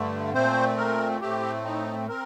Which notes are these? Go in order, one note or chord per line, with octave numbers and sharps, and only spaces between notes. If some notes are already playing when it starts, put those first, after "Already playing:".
Already playing: G2 D3 A3
A#2 A3 C4 C5
A#4
A2 A3 C4 G4
D#4
C4 A#4